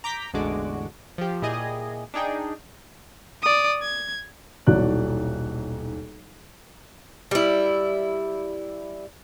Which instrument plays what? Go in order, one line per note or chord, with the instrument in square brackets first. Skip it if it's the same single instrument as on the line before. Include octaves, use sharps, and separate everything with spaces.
[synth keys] A#5 D6 G6 B6
A1 E2 D3 G#3 F#4 D6
F3 G4
A#2 E4 G4 G#4 D#5 G#5
D4 D#4 G#4 G5
[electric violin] D5 D#6
G#6
[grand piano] D#1 B1 E3 F#4 D5 F#6
[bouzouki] G3 E4